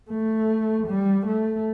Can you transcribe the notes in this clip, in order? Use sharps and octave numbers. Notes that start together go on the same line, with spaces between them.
A3
G3
A3